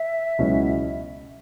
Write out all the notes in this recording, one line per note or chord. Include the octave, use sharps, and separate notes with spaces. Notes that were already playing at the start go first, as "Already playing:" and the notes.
Already playing: E5
C#2 B2 F#3 C#4 E4